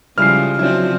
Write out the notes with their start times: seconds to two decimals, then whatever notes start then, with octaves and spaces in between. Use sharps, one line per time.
0.18 C#3 F3 G3 G#3 E4 F6 C7
0.59 C#3 F3 F#3 C4 D4 E4